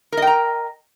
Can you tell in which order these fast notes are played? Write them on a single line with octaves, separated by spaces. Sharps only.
A#4 D#5 G5 A#5